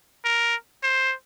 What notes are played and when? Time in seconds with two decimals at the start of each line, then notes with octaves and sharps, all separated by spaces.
0.24 A#4
0.83 C5